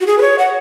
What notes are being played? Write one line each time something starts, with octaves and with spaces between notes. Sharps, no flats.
F#4
G#4
B4
C#5
F#5